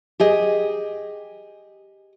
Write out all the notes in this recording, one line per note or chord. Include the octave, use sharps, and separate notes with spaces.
G4 G#4 D#5